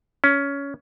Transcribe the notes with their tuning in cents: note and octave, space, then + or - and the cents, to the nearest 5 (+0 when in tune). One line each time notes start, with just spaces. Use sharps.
C#4 +15